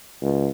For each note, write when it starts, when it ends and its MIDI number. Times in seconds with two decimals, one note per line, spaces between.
0.21 0.48 37